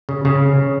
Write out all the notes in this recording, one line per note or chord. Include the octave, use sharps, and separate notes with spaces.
C#3
C#3